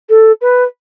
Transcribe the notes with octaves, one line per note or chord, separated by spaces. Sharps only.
A4
B4